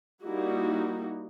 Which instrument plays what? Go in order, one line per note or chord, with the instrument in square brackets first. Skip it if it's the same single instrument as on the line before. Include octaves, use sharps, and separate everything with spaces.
[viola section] G3 A#3 D#4 E4 F#4